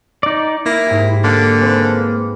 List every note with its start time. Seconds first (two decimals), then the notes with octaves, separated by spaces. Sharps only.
0.23 D#4 D5
0.66 A#3 E4
0.86 G#2 G4
1.24 D3 A#3
1.60 G#3 C4 B4